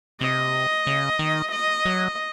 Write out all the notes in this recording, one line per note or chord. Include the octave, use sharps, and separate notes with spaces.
C3 D#5
C#3
D#3
D#5
F#3